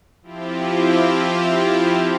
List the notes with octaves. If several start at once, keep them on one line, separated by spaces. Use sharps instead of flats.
F3 C4 E4 F4 G4